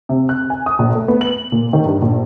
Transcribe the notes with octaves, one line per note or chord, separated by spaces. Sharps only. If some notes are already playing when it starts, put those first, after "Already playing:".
C3
F#6
G#5
D#6
A#1
A3
B3
F#7
A#2
D#3
G2
A#1